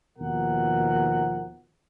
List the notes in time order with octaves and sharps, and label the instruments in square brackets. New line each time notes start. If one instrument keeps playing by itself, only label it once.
[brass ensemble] D#2 B2 F3 A#4 F#5